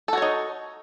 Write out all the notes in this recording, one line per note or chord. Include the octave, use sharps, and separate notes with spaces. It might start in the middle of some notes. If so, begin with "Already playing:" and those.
D#4 F#4 A4 C#5